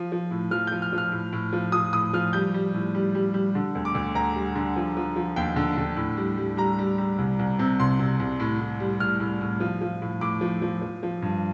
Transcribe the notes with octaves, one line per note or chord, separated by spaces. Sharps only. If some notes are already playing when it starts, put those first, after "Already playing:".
Already playing: F3
F3
A2
F3 F6
F3 G6
F6
F3
F6
A2
A2
F3
F3 D#6
A2 D#6
F3 F6
G3 G6
G3
A2
G3
G3
G3
D3
D2
D6
D2
D2 A#5
G3
D3
F3
F3
F3
D#2 G5
D3
D3
A2
G3
G3
G3 A#5
G3
G3
C2
C2
C3
C2 C6
C3
C2
A2
A2
G3
A2 F6
A2
A2
F3
F3
A2
A2 D6
F3
F3
F3
F3
G2